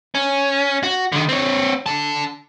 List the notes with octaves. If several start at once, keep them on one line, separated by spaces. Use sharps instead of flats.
C#4
F#4
D3 D#3
C4 C#5
D3 A5